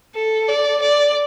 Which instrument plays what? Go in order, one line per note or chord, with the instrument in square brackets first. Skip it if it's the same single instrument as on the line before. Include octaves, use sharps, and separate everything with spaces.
[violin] A4
D5
D5